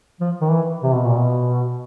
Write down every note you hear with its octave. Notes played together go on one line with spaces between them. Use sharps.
F3
D#3
E3
C3
B2
A#2
B2